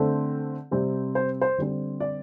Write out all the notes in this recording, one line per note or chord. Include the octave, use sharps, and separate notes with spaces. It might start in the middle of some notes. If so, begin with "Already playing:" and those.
Already playing: D3 A3 C4
C3 G3 C4
C5
C5
D3 G3 C4
D5